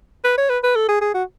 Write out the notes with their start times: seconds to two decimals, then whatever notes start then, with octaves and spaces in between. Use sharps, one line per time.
0.24 B4
0.38 C#5
0.49 B4
0.63 B4
0.76 A4
0.88 G#4
1.01 G#4
1.14 F#4